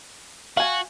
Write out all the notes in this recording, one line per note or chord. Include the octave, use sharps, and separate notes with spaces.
F#4 F5 G#5